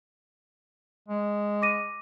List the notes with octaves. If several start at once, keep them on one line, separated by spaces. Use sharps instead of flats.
G#3
D6 A#6 D#7